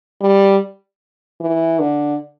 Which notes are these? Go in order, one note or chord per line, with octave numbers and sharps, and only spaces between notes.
G3
E3
D3